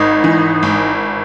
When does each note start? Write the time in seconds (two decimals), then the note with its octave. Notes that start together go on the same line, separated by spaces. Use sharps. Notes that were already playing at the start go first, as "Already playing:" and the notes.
Already playing: G#1 D#4
0.24 E3
0.63 G#1